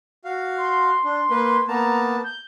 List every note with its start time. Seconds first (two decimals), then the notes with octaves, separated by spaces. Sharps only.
0.25 F#4 F5
0.57 C6
1.04 D4
1.30 A#3 B4
1.68 A#3 B3 A5 A#5
2.24 G6